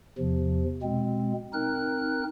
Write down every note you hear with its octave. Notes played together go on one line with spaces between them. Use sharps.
E2 C3 F3
B2 G#3 C4
C4 D#4 A#4 F#6